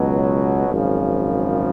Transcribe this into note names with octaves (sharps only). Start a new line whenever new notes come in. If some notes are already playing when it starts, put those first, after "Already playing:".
Already playing: C#2 B2 F#3
G#1 F#2 C#3 F3